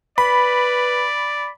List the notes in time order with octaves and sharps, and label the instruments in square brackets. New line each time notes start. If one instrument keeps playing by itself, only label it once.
[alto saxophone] B4 [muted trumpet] D5 [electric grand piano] B5